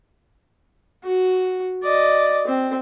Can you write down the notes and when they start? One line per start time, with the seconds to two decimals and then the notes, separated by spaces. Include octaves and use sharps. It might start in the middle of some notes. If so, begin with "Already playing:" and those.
1.04 F#4
1.83 D5 D#5
2.47 C4